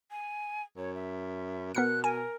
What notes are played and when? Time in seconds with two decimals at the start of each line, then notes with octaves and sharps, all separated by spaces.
0.11 G#5
0.77 F#2 C#5
0.95 E5
1.75 B2 B3 A#4 F#6 C#7
2.04 A#4 G#5